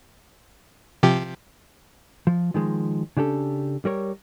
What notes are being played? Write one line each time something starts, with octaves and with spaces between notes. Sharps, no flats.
C3 F3 G4
F3
D#3 F3 G#3
C#3 D4 G4 A4
G3 A#4 C#5